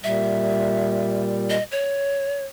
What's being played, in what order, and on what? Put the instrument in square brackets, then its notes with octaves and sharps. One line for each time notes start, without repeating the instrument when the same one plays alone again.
[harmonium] A#2 G3 [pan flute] E5
[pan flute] D#5
C#5